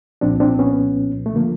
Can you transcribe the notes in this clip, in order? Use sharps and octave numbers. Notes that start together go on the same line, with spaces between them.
C2 A#2 F3 C4 D4
C4 D4
B3 C#4
A3
D3 F3 A#3